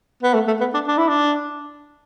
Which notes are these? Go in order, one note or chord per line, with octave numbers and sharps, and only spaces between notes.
B3
A3
A3
B3
D4
D4
E4
D4